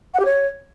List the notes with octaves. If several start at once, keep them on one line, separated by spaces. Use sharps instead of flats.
F#5
G4
C#5